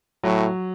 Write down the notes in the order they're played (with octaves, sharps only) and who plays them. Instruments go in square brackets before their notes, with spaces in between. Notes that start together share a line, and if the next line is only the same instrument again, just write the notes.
[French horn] A2 [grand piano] F#3